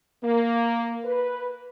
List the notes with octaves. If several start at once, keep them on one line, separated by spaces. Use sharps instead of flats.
A#3
B4